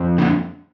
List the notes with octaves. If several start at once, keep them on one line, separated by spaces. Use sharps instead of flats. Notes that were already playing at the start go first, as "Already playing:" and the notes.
Already playing: F2
D3